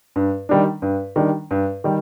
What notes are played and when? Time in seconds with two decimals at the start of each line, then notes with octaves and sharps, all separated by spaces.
0.16 G2
0.49 D#3 G3 D4
0.82 G2
1.16 D#3 G3 D4
1.51 G2
1.84 D#3 G3